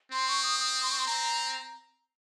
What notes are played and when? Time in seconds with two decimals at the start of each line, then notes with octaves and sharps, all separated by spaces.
0.12 C4 C6
0.28 C#6
0.43 D#6
0.59 D#6
0.83 C6
0.90 C#6
0.98 C6
1.06 C4 A#5